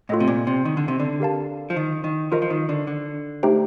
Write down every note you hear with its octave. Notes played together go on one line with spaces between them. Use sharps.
A2 F4 A4 D#5
C3
A#2
C3
D#3
D3
C3
D3
G4 A#4 F5 A5
F3
D#3
D#3
F3 F4 A#4 D#5
F3
D#3
D3
D3
A3 D#4 G4 C5 G5